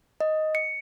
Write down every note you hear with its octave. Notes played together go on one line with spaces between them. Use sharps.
D#5
C#7